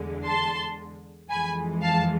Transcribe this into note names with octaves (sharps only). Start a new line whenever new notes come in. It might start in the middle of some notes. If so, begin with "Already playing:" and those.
Already playing: E2 D3 G#3
A5 C6
F2 E3 G#3 G#5 B5
F5 A5